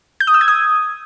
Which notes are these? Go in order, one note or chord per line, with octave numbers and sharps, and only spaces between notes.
G6
D#6
E6
G#6
D#6